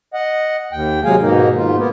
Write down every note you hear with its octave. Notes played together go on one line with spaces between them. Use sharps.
D#5 F#5
D#2 G5
C3 F#3 G#3 G#4 F5 G#5
G#2 B2 D#3 A#3 D#4
G#2 F4
A#3 B3